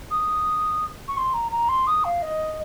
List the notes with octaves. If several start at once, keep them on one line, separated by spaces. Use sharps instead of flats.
D#6
C#6
C6
A#5
A#5
C6
D#6
F5
D#5